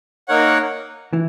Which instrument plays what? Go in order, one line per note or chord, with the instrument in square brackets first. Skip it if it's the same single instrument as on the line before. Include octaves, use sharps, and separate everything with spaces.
[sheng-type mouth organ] A#3 D#4 A#4 C#5 F#5
[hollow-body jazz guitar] E3